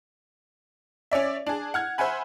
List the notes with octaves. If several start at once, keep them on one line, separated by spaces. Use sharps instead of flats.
C#4 C#5 D5 E5
D4 G#4
F#5 F6 G#6
C5 E5 F#5 G#5 B5